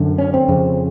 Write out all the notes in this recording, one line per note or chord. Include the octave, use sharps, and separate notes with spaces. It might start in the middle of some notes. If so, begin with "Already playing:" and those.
Already playing: F#2 D3
C#4
C4
F2 C#3